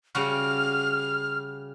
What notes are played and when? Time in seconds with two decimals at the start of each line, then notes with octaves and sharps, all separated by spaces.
0.15 C#3 G3 F#4 F6